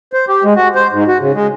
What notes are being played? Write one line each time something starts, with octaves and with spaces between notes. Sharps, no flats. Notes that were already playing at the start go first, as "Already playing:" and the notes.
C5
G4
G#3
F#4
C5
G#2
F#4
C#3
G#3